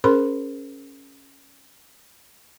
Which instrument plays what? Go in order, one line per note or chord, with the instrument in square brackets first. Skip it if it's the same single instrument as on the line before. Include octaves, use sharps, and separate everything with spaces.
[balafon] C#4 G#4 A#4 C5 B5 C6